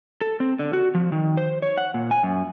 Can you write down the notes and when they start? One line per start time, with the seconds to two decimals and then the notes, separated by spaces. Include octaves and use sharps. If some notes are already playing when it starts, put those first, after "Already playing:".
0.21 A4
0.40 C4
0.59 D3
0.73 F#4
0.95 F3
1.12 D#3
1.37 C5
1.62 C#5
1.77 F#5
1.94 A#2
2.11 G#5
2.23 F#2